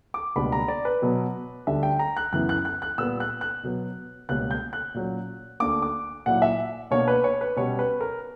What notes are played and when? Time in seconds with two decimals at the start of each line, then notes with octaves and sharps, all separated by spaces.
0.14 D6
0.36 C#2 B2 G3 A#3 D4 B5
0.52 A#5
0.68 D5
0.85 B4
1.02 B2 F#3 B3
1.67 D2 D3 G3 E5
1.83 G5
1.99 A#5
2.17 F#6
2.32 F#2 C#3 E3 B3 E4 F#6
2.49 F#6
2.65 F#6
2.82 F#6
2.98 A#2 G3 B3 E6
3.20 F#6
3.41 F#6
3.63 B2 F#3 B3
4.29 C#2 B2 G3 A#3 C#4 F#6
4.51 G6
4.73 F#6
4.94 A#2 F#3 C#4
5.60 D2 D3 A#3 D6
5.82 D6
6.26 A#2 F#3 A#3 E4 F#5
6.42 E5
6.91 B2 A#3 D4 C#5
7.08 B4
7.24 C#5
7.41 B4
7.57 B2 G3 C#4 C#5
7.79 B4
8.01 A#4